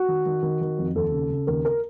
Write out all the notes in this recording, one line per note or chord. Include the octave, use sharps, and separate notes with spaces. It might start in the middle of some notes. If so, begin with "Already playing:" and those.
Already playing: F#4
D#3
D#3
D#3
D#3
F2
D#2 A4
C#3
C#3
D#2 A#4
A#4